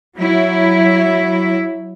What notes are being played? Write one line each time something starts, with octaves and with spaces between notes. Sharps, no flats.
F#3 E4